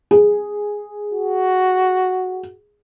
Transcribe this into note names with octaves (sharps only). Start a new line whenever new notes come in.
G#4
F#4